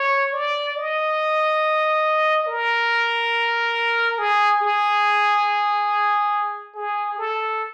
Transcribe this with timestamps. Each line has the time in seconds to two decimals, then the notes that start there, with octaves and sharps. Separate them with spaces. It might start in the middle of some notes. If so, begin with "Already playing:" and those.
Already playing: C#5
0.33 D5
0.76 D#5
2.47 A#4
4.18 G#4
4.62 G#4
6.75 G#4
7.18 A4